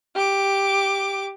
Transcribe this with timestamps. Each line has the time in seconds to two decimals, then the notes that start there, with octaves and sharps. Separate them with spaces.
0.15 G4 D6